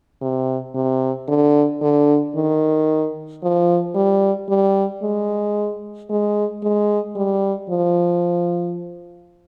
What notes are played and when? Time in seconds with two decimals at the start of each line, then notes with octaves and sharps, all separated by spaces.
0.22 C3
0.75 C3
1.28 D3
1.82 D3
2.35 D#3
3.43 F3
3.95 G3
4.49 G3
5.03 G#3
6.10 G#3
6.63 G#3
7.16 G3
7.70 F3